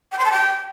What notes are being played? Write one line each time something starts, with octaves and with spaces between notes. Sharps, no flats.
G5
C6
A5
G5